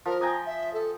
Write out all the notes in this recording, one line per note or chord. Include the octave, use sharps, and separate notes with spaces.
F3 A#4
G5 G#5 A#5 D#6
E5
A4